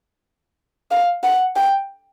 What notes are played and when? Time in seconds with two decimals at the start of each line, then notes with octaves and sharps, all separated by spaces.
0.91 F5
1.24 F#5
1.56 G5